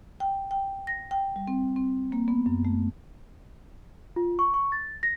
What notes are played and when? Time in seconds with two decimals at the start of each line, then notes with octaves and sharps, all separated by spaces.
0.20 G5
0.51 G5
0.87 A#6
1.11 G5
1.36 G3
1.48 C4
1.76 C4
2.12 A#3
2.28 B3
2.46 F#2
2.65 A3
4.16 F4
4.39 C#6
4.54 C#6
4.72 A6
5.03 A#6